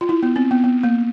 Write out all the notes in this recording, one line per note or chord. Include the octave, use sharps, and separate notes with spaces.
F4
E4
B3
C4
B3
B3
A#3